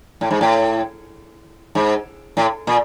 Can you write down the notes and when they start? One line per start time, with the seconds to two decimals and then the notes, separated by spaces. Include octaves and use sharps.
0.21 A2
0.31 G#2
0.41 A2
1.75 G#2
2.37 A2
2.67 A#2